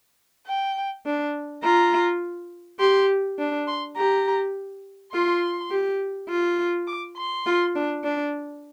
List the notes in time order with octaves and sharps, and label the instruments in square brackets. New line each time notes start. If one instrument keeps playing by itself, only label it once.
[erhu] G5
[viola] D4
[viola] F4 [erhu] A#5
[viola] G4 [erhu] C6
[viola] D4
[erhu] C6
[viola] G4 [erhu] A#5
[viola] F4 [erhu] C6
[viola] G4
F4
[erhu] D6
C6
[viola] F4
D4
D4